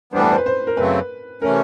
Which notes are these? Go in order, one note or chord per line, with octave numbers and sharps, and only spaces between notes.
A2 E3 G3 B3 D4 C5
B4
C5
B4
C5
A#4
F#2 C#3 F#3 A3 C4 B4
C3 E3 A3 C#4 A#4